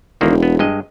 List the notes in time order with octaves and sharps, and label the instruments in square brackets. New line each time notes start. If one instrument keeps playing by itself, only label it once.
[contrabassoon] E1 [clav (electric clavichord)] D3 D#3 A#3
[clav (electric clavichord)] B3
G2 G#3 D#5